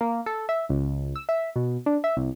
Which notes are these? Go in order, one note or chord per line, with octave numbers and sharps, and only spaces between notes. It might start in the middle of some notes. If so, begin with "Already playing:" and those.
A#3
A4
E5
C#2
E6
E5
B2
D4
E5
C2